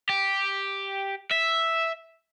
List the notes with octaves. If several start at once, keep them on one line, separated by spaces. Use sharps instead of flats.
G4
E5